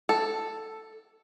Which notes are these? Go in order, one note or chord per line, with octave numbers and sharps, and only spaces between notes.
A4